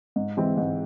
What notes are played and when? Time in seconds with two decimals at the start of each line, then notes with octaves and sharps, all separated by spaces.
0.16 G#2
0.37 E3 G#3 C4 E4
0.57 G#2